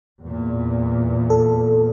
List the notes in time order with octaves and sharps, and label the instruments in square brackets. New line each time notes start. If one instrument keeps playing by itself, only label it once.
[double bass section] E2 A#2
[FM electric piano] A4